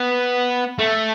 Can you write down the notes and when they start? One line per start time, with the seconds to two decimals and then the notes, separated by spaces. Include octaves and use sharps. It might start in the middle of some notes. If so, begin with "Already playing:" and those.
Already playing: B3
0.79 A3